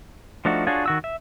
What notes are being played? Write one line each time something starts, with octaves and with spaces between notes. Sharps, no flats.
F3 A3 D4 D#4 F#4
D4 F4 F#4 G#4 C#5
D#3 F#4 E6
E5